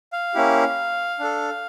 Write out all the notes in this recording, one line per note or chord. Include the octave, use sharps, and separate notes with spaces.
F5
A#3 C#4 E4 G4
D4 A4